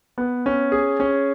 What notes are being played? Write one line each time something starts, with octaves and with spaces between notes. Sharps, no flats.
B3
C#4
G#4
C#4